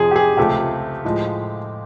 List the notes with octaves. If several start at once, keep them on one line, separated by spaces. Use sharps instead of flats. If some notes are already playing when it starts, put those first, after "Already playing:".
Already playing: F2 C3 F3 G#4
G4
G#4
C#2 C3 F3 A3 G4
A2 F3 G#3